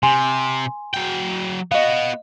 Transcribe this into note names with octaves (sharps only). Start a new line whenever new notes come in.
C3 G#5 C6
F#3 G5
B3 F#4 D#5 F5